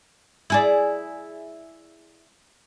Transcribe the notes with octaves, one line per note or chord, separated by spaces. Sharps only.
E4 G#4 D5